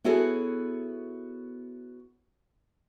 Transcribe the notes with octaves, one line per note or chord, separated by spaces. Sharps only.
B3 E4 F#4 G#4 A4 C#5